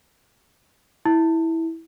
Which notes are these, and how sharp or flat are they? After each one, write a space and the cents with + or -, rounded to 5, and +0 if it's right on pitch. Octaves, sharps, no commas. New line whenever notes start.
E4 -15